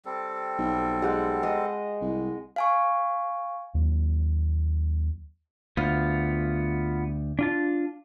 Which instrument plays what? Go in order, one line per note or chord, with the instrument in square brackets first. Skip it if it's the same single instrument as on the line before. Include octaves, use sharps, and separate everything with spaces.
[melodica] G3 C4 A4
[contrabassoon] B1
[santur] G#3 G4 F#5
G#3 D#5
[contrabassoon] C2
[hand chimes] F5 G#5 C#6
[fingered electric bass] D#2 F#3
[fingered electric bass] D2 [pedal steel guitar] B3 F4 F5
[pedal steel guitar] D4 F4 A5